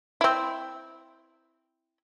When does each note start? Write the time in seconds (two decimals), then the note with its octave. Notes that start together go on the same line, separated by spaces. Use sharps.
0.21 C4 E4